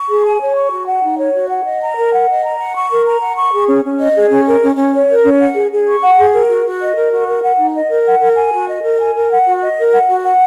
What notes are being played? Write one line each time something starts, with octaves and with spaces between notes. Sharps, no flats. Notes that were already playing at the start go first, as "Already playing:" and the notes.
Already playing: C#6
G#4
G#5
C#5
C#6
F#4
F#5
D#4
C#5
F#4
F#5
D#5
A#5
A#4
F#5
D#5
A#5
F#5
C#6
A#4
A#5
F#5
C#6
G#4
C#4
C#4
D#5
G#4
C#4
A#4
C#4
C#4
C#5
A#4
C#4
F#5
G#4
G#4
C#6
F#5
G#4
A#4
F#4
F#4
D#5
A#4
F#4
A#4
F#5
D#4
D#5
A#4
F#5
A#4
G#5
F#4
D#5
A#4
G#5
A#4
F#5
F#4
D#5
A#4
F#5
F#4
F#5